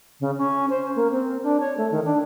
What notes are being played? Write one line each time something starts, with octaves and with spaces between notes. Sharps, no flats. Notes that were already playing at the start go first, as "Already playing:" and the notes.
C#3
C#4
C5
A#3
C4
D4
C#5
A3
D#3
D4